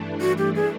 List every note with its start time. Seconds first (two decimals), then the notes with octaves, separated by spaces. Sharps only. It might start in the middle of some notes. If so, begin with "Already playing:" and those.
Already playing: G2 E3 A3 D4
0.21 F#4
0.38 G4
0.55 G#4